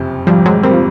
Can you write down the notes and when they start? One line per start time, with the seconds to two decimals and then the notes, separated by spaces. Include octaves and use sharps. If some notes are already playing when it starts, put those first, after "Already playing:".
Already playing: F#1 F2 C3
0.27 G#1 F3 G3
0.46 F#3 G#3
0.63 G3 A#3 C4
0.74 F3